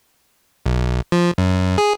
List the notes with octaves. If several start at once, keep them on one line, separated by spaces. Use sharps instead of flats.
B1
F3
F#2
G#4